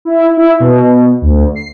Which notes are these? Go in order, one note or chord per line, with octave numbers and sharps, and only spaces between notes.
E4
E4
B2
D2
C7